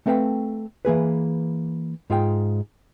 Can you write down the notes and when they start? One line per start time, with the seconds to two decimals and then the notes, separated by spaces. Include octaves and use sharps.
0.06 A3 C4 A4 B4 F5 G5
0.85 E3 A#3 G#4 B4
2.10 G#2 F4 G#4 G5